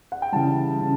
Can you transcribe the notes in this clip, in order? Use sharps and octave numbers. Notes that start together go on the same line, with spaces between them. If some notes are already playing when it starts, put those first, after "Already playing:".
F#5
G5
C#3 E3 G3 A5
C#3